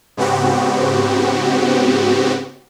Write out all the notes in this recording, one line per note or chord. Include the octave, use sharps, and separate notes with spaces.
G#2 C#3 B3 C4 F#4 G4